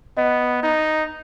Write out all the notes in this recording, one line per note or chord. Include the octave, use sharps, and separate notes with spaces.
B3 D#5
D#4